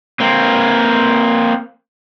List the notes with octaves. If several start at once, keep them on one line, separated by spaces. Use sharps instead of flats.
A#3 C4